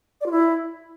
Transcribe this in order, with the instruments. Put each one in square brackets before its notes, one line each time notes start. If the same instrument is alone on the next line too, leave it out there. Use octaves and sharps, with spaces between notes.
[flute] D5
F4
E4